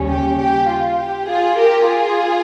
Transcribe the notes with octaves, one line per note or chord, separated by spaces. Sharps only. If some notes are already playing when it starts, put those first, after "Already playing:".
Already playing: D#2 C#3 G3 C#4
G4
G4
F4
G4
F4 G#4
G4 A#4
F4 G#4